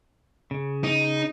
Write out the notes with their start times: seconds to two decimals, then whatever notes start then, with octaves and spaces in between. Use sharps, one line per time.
0.51 C#3
0.84 D#4